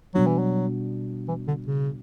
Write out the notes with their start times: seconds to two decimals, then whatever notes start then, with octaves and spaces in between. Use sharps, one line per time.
0.15 B2 F#3 G3 B3 D4 F#4
0.27 E3
0.39 F#3
1.28 E3
1.47 D3
1.66 C#3